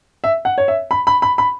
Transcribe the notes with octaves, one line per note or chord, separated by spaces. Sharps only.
E5
F#5
C#5
E5
B5
B5
B5
B5